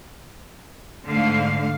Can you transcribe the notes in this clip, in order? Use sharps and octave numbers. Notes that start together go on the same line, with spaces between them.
G#2 D3 A3 F5